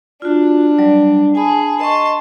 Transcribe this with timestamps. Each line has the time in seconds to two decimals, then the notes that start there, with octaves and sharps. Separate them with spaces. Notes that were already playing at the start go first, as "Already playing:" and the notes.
0.22 D4 F4 F#4
0.78 F#3 G3 D5
1.35 G#4 G#5 A5 B5
1.81 D#5 A5 C6 C#6